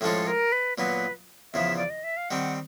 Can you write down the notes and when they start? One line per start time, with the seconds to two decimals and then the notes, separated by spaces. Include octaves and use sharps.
0.01 A2 F3 G#3 C#4 F4 A4
0.27 A#4
0.52 B4
0.78 A#2 F#3 B3 B4
1.54 E2 C#3 F3 E5
1.77 D5
1.90 D#5
2.04 E5
2.17 F5
2.30 D#3 G3 C4 F#5